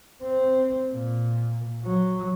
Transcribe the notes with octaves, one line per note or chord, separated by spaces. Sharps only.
C4
A#2
F#3